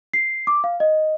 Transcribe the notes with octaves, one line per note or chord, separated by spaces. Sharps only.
C7
D6
F5
D#5